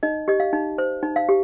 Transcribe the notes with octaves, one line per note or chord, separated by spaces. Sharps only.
D#4 D#5
G4 D#5
F5
D#4
C5
D#4
F5
G4